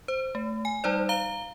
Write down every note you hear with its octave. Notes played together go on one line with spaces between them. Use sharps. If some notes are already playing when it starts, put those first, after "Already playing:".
C5
A3
G#5
G3 D#4 C5 D5
F5 A#5 G7